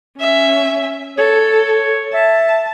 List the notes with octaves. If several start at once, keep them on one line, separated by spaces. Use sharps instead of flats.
C#4 E5
A4 C#5
E5 A5